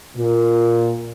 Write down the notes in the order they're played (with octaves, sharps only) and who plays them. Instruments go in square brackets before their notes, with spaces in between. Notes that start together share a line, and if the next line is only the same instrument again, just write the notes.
[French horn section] A#2